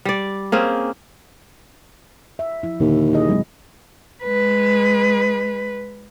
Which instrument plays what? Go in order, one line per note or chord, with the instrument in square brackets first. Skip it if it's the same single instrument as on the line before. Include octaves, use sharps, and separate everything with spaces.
[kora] G3 D5
A#3 C4 C#4 G#4
[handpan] E5
F3 E4
[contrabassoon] D#2 [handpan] A#2 D3
[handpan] E4 G#4 D#5
F#3 G#3 C4
[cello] G#3 B4